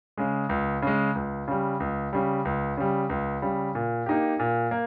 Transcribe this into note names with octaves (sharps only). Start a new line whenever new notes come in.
C#3 G#3
C#2
C#3 G#3
C#2
C#3 G3
C#2
C#3 G3
C#2
C#3 G3
C#2
C#3 G3
A#2
A#3 D#4 G4
A#2
A#3